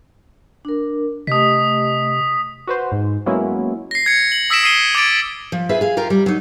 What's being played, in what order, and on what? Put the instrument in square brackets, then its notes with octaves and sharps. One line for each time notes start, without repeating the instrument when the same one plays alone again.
[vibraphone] D4 A#4
[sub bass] C3 [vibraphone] A3 G4 D#5 [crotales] D#6 B6
[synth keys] F#4 B4 C5
G#2
F#3 G#3 A#3 B3 C#4 E4
[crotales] A#6 C7
G#6 C#7
F#7
D#6 E6 A#6 B6 D7 E7
D#6 C7 D#7 G7
D6 G#6 A6 D7
[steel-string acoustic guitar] F3
F4 G#4 B4 E5
G#4 F5
F4 G4 A#4 F5
G3
F#3 D#4